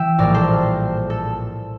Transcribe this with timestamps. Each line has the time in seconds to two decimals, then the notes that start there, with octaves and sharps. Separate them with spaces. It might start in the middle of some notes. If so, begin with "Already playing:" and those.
Already playing: E3 E5 G5
0.18 A#1 A2 G3 A#3 A#4 D5
0.34 A4 C5
1.10 A4